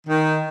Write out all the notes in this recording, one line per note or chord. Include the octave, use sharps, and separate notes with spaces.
D#3